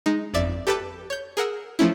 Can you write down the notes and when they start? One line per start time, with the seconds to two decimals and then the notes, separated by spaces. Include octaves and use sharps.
0.06 G#3 D#4
0.34 G1 F2 D5 E5 A6
0.67 G4 A4 B4 G5 A5 D6
1.10 C#5 G6
1.37 G#4 A#4 F#5 E6
1.79 F3 A3 C#4 E4